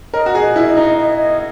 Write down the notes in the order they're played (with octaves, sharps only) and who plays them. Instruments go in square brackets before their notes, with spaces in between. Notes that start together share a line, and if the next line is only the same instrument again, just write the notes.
[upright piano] A#4 [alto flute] D#5
[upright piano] F#4
G#4
[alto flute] D#5
[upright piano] E4
[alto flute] D#5
[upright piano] D#4
[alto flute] D#5
D#5